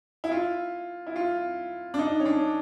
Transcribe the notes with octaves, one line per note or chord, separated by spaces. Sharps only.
E4
F4
E4
F4
D4
D#4
C#4
D4